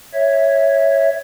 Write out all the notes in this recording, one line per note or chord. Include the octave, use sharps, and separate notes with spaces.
C#5 E5